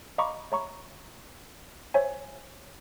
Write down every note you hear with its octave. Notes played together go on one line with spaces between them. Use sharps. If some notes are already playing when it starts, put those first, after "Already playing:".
D#5 F5 A#5 B5 C#6 D6
C#5 E5 A#5 B5 C#6
C5 C#5 E5 G#5